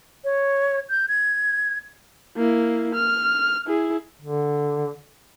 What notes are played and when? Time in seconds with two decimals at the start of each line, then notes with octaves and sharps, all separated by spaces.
0.24 C#5
0.90 G6
1.09 G#6
2.37 A#3 E4
2.95 F6
3.67 E4 G#4
4.22 D3